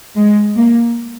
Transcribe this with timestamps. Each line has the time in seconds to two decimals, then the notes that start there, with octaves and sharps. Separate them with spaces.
0.17 G#3
0.56 A#3